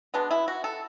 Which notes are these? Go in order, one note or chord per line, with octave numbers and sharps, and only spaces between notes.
B2 G#3 B3 D4
E4
F#4
A4